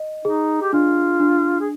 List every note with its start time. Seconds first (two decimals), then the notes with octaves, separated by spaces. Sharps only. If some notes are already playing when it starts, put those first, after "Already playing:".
Already playing: D#5
0.25 D#4 G#4
0.61 G4
0.73 D4 F4
1.20 D4
1.60 G#4